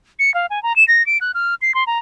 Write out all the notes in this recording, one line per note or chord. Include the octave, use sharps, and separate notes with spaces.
C#7
F5
G#5
A#5
E7
A#6
D7
F#6
F6
C7
C6
A#5